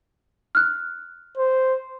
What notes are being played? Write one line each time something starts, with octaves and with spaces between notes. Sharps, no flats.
F6 F#6
C5